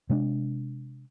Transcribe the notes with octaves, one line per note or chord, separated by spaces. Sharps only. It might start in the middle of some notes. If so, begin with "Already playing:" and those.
C3 G#3 C#4 D4